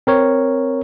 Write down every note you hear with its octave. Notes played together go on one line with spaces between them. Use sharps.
C4 A#4 C#5